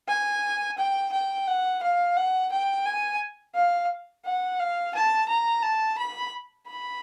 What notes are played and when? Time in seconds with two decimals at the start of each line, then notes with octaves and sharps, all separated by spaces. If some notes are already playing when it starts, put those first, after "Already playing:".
0.08 G#5
0.78 G5
1.13 G5
1.47 F#5
1.83 F5
2.17 F#5
2.52 G5
2.86 G#5
3.55 F5
4.25 F#5
4.59 F5
4.95 A5
5.29 A#5
5.63 A5
5.98 B5
6.67 B5